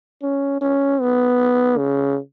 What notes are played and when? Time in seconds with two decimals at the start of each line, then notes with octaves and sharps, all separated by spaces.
0.22 C#4
0.61 C#4
1.01 B3
1.78 C#3